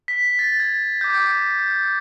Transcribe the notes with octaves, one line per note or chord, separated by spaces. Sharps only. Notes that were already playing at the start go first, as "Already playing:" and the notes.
B6
A6
G#6
D6 G6